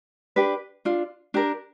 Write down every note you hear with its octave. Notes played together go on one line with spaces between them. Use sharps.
D4 G4 B4
D4 F4
D4 G4 A#4